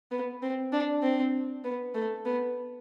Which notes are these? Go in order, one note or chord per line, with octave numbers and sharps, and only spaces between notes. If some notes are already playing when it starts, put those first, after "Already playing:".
B3
C4
D4
C4
B3
A3
B3